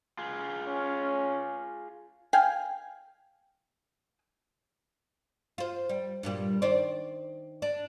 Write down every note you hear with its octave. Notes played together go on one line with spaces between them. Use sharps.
F4 G#4
C#4
F5 G5 G#5
F4 C5
G3
G2 A#2 G3
D#3 C5 D5
D4